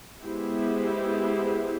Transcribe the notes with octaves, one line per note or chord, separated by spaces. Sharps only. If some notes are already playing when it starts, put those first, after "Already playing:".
G#3 B3 E4 G4 C5